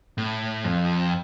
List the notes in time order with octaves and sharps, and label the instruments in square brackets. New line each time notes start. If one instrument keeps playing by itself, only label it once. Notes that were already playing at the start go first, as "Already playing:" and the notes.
[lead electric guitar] A2
F2